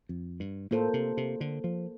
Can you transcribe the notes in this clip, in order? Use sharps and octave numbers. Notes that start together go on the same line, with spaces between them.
F2
G2
A2 A#3 F4 A4 C5
C3
C3
D3
F3